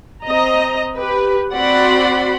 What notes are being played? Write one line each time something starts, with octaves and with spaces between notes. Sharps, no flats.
C4 D#5 A#5
G4 B4
C4 F#4 D5 F#5 B5 C6